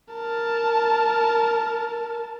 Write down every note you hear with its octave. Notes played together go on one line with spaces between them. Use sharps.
A#4 A5